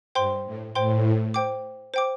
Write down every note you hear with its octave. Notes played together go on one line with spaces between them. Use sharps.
G2 C5 G5 C6
A2
A2 C5 G5 C6
C5 G5 D6
C5 G5 D6